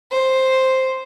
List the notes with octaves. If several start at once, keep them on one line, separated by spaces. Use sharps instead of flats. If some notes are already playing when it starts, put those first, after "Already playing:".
C5